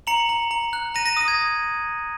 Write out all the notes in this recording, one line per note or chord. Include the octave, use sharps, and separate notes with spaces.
A#5 C#7 F#7
A#5
A#5
F#6
A#5 A#6 D#7
A#6 D#7
D#6 A#6
G#6